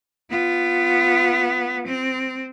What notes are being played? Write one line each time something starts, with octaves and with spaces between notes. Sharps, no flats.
B3 F4
C4